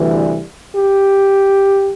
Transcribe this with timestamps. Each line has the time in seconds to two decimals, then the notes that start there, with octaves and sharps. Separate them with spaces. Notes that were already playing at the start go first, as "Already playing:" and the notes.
Already playing: D2 C3 E3 G3
0.75 G4